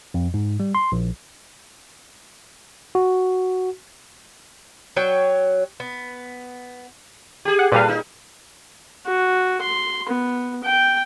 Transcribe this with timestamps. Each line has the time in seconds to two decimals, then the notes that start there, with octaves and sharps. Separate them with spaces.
0.14 F2
0.34 G#2
0.60 G3
0.75 C6
0.92 A#1
2.95 F#4
4.96 F#3 C#5 G5
5.80 B3
7.45 G4 G#4
7.59 F#5
7.72 A#2 G3 A4 B4 F5
7.89 D#4
9.06 F#4
9.62 C6
10.09 B3
10.64 G5